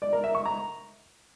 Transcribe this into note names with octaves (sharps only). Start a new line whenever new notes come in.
D5
A#4
E5
C#6
A#5